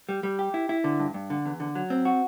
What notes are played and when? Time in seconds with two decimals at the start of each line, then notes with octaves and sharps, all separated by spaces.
0.09 G3
0.23 G3
0.39 G4
0.54 E4
0.69 E4
0.84 D3
1.00 G2
1.14 G2
1.30 D3
1.45 E2
1.60 D3
1.75 F#3
1.90 C4
2.05 F#4